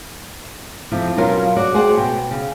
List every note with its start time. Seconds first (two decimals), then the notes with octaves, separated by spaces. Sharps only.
0.92 F2 C3 F3 E4
1.17 B2 F#3 C#4 F4 A#4 F5
1.56 F#4 C#5 D5
1.74 F#4 G#4 C5 D5 F#5 G5
1.97 B2 G5
2.31 C#3